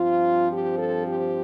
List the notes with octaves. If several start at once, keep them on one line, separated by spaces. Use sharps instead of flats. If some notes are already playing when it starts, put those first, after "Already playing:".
Already playing: G2 F3 C4 F4
G4
A4
G4